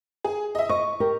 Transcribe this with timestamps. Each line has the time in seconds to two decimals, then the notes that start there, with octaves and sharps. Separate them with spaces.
0.24 G#4
0.55 D#5 E5
0.69 D#5 C#6
1.00 G4 A#4